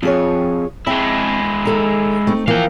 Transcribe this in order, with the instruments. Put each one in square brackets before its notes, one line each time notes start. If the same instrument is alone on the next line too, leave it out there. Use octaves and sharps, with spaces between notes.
[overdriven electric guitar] F2 [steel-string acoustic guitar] F4 G#4 C#5
[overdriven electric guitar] G#3 E4 [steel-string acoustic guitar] C4 E5 A5
[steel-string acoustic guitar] D#2 A4 A#5
A3 C4 D#4
[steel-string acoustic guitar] E3 F3 A#3 [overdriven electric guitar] F5 G5